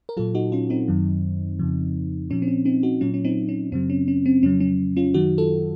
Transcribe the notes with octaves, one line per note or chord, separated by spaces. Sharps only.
A#4
A#2 F#3 F4 A4
D#4 F#4
C#4 F4
C4 D#4
F#2 D#3 F#3
F2 C#3 F3
A#2 F3 C#4
C4
C#4
C4 D#4
D#4 F#4
A#2 F#3 C#4 F4
C#4
C4 D#4
C#4
F#2 C#3 F#3 C4
C#4
C#4
C4
F2 C#3 F#3 C#4
C#4
C#4 F4
F#2 D#3 F#3 D#4 F#4
F4 A4